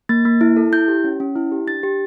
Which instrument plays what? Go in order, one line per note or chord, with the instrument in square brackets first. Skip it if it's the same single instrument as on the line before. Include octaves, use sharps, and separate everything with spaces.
[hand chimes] A#3 A6
A#3
E4
A4
E4 G6
G4
C#4
C#4
E4
G4
D4 A6
G4